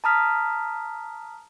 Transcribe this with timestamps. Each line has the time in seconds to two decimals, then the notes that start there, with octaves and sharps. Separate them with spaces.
0.04 A5 A#5 D#6 F6 B6